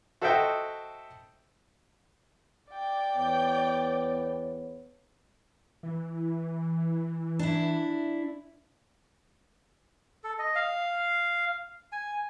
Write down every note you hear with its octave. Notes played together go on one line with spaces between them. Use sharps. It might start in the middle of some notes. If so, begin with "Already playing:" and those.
F#4 A4 C5 D#5 E5 G5
D5 G5
E2 B3 C#5
E3
D4 E4
A4
D#5
F5
G#5